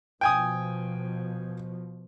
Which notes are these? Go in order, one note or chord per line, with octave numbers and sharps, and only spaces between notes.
B2 F3 G5 G#5 D#6